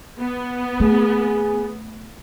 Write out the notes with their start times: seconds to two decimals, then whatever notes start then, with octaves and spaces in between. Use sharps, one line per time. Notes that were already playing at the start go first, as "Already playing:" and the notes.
0.20 B3
0.80 A3 G#4